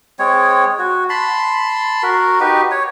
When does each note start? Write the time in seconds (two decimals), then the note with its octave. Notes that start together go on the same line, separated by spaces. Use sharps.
0.19 G#3 C4 C#5
0.79 F#4
1.10 A5 B5 C6
2.03 F#4 A#4
2.40 D#4 F#4 G4 B4
2.71 C#5